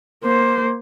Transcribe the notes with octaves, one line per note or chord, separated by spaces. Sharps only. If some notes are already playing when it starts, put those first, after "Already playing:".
A#3 C5